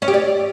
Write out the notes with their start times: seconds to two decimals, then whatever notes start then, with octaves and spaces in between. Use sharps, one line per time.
0.02 C#4
0.08 G4
0.14 D5